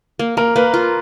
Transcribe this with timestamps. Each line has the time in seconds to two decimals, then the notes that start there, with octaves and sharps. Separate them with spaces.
0.19 A#3
0.37 A#3 A#4
0.56 A#3 B4
0.74 F4